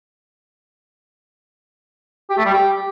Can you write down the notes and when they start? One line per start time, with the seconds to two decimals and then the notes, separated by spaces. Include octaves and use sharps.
2.30 G4
2.37 A3
2.45 G3
2.53 G4